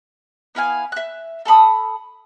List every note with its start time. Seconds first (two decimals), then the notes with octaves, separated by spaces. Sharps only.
0.55 B3 E4 F5 G#5
0.92 E5 F#6
1.45 A4 A5 B5 D#6